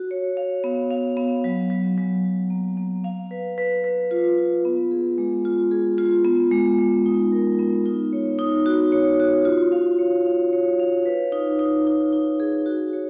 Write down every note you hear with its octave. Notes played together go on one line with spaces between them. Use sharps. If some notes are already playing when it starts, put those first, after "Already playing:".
Already playing: F#4
C#5
F5
B3
F5
B3
F#3
F#3
F#3
F#3
A#3
A#3
F5
B4
B4
B4
F4
F4
B3
G#4
G#3
F4
G#4
F4
B3
G#3
G#3
D#4
A#4
B3
D#4
C#5
D#4
F#4
C#5
F#4
F4
F5
C#5
F5
C#5
F5
B4
D#4
D#4
D#4
D#4
G#4
F#4
C#5